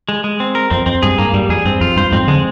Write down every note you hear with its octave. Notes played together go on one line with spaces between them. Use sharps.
G#3
G#3
C4
A#4
F2 C4
F2 C4
G2 G#4
G2 A#3
G2 G3
F2 G#4
G2 C4
F2 F4
G2 C5
F2 G#2 C4
D3 F3 G#3